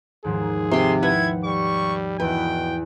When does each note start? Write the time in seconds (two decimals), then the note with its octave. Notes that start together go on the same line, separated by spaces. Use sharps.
0.24 D#2 G#2 F3 G#4
0.71 C3 G5 C6
1.03 E4 B4 F#5 G5 G#6
1.45 G3 C#6
2.20 E2 B2 E4 B4 G5